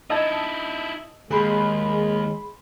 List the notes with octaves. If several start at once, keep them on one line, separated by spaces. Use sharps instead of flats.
D#4 E4 D#5 A5 D#6 E6 G#6
D#2 G#3 G#4 B5 C6